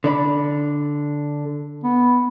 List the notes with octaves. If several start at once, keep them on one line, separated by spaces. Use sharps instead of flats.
D3 D5 B5
B3